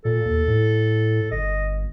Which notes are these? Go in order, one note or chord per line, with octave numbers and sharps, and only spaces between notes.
A#2 A4
D#2
A2
G1 D#5